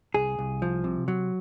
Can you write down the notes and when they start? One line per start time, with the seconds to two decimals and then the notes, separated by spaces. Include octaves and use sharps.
0.14 C2 G#4
0.39 C2
0.62 F3
0.84 C3
1.08 F#3